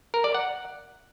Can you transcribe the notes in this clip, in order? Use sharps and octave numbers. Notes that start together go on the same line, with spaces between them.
A#4
D5
F#5